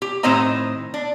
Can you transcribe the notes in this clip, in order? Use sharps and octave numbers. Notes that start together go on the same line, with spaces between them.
G4
A2 D#3 C4 C5 D#5 A#5
D4